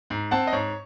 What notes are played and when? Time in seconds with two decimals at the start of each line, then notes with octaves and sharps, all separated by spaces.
0.10 G#2
0.31 C4 F#5 A5
0.47 D#5
0.52 G#2 C#5